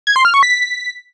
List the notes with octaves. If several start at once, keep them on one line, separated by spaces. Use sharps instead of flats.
G#6
C6
F6
C#6
B6